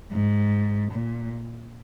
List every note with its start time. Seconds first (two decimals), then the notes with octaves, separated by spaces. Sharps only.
0.12 G#2
0.92 A#2